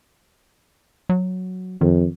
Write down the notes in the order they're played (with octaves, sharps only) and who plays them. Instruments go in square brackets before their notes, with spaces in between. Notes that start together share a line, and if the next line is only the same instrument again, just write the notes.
[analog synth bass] F#3
[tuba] F2 [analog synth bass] D#3